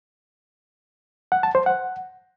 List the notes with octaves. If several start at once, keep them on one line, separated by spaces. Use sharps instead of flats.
F#5
A5
C5
F#5